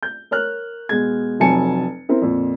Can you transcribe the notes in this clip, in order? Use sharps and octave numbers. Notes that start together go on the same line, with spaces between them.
G6
A#4 C#5 F6 F#6
B2 G#3 G#6
F1 F2 F#3 G#5 A5 C#7
C4 E4 A#4
F2 A#2